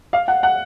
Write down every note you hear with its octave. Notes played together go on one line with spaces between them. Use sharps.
F5
F#5
F#5